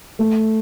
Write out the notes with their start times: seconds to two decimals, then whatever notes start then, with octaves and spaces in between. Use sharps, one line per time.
0.19 A3